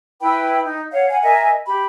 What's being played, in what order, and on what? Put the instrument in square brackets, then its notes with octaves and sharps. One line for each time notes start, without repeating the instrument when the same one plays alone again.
[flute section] E4 B4 G5 B5
D#4
C#5 F5 F#5
F5 F#5 G#5
A#4 D#5 E5 G#5
G4 B5